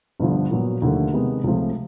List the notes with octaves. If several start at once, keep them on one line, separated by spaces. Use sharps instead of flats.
G1 G2 D3 F3
A#2 F#3 B3
D#2 D3 F3 A3
C3 D#3 G#3 B3 D#4
C#2 C3 F3 A3